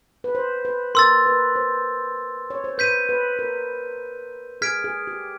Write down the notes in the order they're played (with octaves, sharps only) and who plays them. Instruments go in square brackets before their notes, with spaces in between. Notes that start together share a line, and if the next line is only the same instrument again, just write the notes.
[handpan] B4
C5
B4
[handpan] A#4 [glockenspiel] C6 E6 A6
[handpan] B4
C5
C#5
C5
[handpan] B4 [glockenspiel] G6 B6 D#7
[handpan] B4
A#4
[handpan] G#4 [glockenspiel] F6 G#6 B6 D7
[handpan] G#4
G4